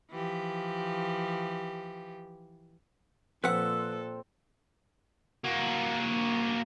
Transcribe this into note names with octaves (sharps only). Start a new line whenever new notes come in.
E3 F3 G4
A#2 F3 C4 A4 B4 F#5 E6 F#6
A#3 F#4